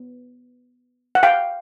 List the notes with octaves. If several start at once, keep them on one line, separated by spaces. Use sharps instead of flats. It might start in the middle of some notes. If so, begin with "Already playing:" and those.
Already playing: B3
F#5
F5 G5